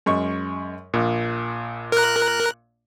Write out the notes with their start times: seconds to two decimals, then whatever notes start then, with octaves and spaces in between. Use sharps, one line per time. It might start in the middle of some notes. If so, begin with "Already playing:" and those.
0.06 F#2 G#3 C#6
0.94 A#1 A#2
1.92 A#4 F#6